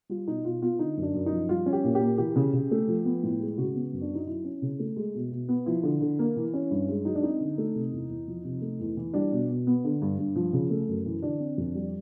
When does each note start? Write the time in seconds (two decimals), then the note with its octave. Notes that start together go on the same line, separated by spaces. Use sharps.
0.09 G3 F4
0.27 B2 D#4
0.44 B2 F4
0.62 B3 F4
0.79 D3 D#4
0.97 F#2
1.02 D4
1.14 F#2
1.26 D#4
1.32 F3
1.49 G3 F4
1.66 C#4
1.73 G4
1.84 A#2
1.95 G4
2.01 A#3
2.18 E3 G4
2.36 C#3
2.53 C#3
2.71 A3
2.88 F3
3.05 B3
3.23 A2
3.40 G#3
3.58 C#3 F#4
3.75 B3
3.93 F#2
4.02 D4
4.10 F#3 D#4
4.27 F#3 E4
4.44 C#4
4.62 C#3
4.79 A3
4.96 G#3
5.15 B2
5.32 B2
5.49 B3
5.66 F3 E4
5.83 D3
6.01 D3
6.19 A#3
6.36 E3
6.54 C#4
6.71 G2
6.89 G#3
7.05 F#3 D#4
7.15 D4
7.23 C4 D#4
7.40 D3
7.58 A3
7.75 C3
7.92 E2
8.09 E2
8.27 F3
8.44 C3
8.62 A3
8.80 E2
8.97 E3
9.14 G3 D4
9.32 B2
9.49 B2
9.67 B3
9.84 D3
10.02 G2
10.19 G2
10.36 F3
10.53 C#3
10.70 A3
10.89 F#2
11.06 E3
11.23 D3 D4
11.40 C4
11.58 F2
11.75 G3